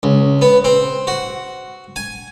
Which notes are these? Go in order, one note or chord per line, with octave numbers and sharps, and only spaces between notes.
C#2
B3
C4
F#4
G#5